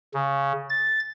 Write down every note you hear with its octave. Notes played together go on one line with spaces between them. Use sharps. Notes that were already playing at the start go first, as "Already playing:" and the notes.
C#3
A6